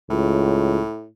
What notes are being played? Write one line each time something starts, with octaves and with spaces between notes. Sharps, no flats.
C#2 A2